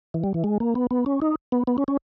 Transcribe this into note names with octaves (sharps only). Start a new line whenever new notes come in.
E3
G3
E3
G#3
A#3
B3
B3
C#4
D#4
B3
B3
C#4
C#4